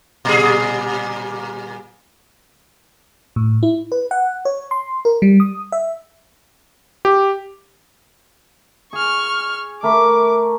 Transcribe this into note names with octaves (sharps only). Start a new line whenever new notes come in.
A#2 G3 G#4
A2
E4
B4
F#5
C#5
C6
A#4
G3
D#6
E5
G4
G#4 C#6 F6
A3 A#4 B5 D6